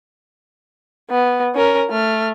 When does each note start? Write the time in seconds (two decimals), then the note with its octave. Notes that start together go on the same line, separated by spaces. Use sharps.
1.11 B3
1.55 C#4 A#4
1.90 A3 F6